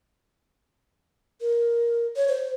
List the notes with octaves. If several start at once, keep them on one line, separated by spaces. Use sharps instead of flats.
A#4
C#5
C5